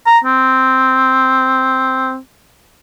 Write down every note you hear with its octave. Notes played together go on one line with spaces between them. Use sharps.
A#5
C4